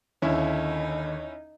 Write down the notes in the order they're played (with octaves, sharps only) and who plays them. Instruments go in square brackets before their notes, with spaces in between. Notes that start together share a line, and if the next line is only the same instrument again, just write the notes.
[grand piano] D#2 D3 [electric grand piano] C#4 E4 E5 [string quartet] D#4